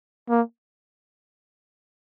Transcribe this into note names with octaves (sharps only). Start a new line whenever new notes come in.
A#3